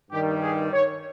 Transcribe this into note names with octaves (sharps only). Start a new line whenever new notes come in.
G2 D#3 G3 G4
G#4
C#5